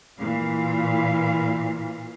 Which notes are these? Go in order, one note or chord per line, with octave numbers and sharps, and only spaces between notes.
A#2 E3 F5